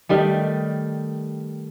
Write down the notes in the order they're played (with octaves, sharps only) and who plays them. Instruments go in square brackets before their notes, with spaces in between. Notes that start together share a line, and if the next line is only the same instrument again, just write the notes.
[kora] D#3 G3 A3